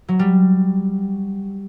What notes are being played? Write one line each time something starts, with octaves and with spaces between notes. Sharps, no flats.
F#3
G3